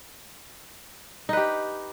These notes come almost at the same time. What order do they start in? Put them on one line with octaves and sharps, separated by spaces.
D#4 B4 G4